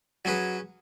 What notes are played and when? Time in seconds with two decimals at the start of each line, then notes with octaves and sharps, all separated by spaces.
0.25 F#3 C#4 G#4 B4